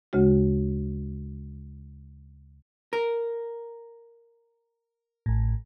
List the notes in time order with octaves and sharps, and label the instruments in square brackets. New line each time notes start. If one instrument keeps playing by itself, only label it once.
[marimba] D2 C#3 G#3 F#4
[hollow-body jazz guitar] A#4
[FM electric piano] A1 A2